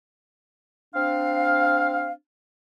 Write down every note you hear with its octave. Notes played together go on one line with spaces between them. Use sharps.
C4 D4 F5